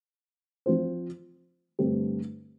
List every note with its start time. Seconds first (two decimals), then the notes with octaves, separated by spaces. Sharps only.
0.66 F3 C4 F4 C5
1.79 G2 D3 A3 C4 G4